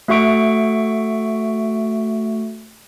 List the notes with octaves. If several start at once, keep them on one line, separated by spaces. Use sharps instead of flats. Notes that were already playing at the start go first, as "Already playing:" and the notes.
A3 F#4 E5 C#6 D7